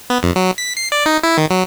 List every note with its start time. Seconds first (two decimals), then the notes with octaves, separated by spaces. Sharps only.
0.10 B3
0.23 F2
0.36 F#3
0.58 B6
0.77 C7
0.92 D5
1.06 D#4
1.23 E4
1.38 D#3
1.50 F#3